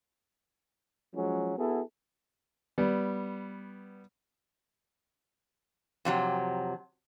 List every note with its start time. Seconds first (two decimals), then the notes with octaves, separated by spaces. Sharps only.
1.14 F3 F#3 G#3 C#4
1.58 B3 E4 F#4 G#4 A4
2.78 G3 B3
6.05 F2 C3 F#3